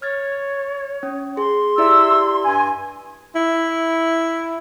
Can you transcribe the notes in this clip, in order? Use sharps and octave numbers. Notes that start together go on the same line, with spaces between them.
C#5 F6 G#6 A6
C#4
G#4 C6
E4 G4 D5 E5 E6
G2 G#5
E4